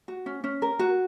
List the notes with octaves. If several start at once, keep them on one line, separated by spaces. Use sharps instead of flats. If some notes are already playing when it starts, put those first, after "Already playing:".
F#4
C#4
C#4
A#4
F#4